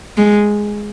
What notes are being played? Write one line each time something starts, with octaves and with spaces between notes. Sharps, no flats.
G#3